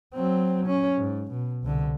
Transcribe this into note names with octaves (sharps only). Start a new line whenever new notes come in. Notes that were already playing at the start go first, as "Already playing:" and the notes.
F#3 C4
C#4
G#2
B2
C2 D3